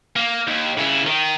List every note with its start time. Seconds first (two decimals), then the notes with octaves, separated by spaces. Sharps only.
0.16 A#3
0.48 D#2
0.78 C#3 E4
1.06 D#3